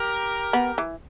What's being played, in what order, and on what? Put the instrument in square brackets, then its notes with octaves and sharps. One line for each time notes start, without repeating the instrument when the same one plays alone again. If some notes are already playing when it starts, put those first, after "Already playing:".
Already playing: [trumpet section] G4 A#4
[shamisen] B3
E3